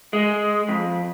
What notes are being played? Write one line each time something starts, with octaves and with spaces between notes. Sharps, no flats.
G#3
F2